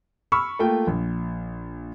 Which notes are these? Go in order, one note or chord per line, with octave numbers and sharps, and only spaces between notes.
B5 C#6 E6 F6
A3 A#3 F4 G5
A#1